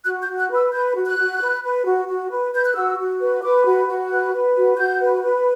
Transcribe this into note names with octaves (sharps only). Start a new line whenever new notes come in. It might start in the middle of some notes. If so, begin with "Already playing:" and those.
F#4 F#6
G6
F#4
F#6
B4
E6
B4 G6
F#4
F#6
F#4
B4
B4
F#4
F#4
B4
B4 G6
F#6
F#4 E6
F#4
B4
B4 D6
F#4
F#4
B4 F#6
B4
F#4
F#4 G6
B4
B4